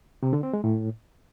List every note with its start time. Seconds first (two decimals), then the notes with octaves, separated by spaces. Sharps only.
0.23 C3
0.33 D3
0.43 C4
0.53 G#3
0.64 A2